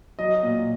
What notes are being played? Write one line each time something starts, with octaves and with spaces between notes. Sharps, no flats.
F#3 D#5
A#2